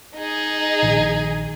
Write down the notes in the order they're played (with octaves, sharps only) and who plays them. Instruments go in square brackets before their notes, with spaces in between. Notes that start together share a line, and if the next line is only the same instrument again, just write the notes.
[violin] D#4 G#4
[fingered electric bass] A#1 A#2 D#3